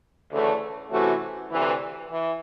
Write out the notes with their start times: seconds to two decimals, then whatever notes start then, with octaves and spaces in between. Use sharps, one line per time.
0.32 D2 C#3 E3 A3
0.91 C3 E3 A3 C#4 F#4
1.51 D2 C3 E3
2.11 E3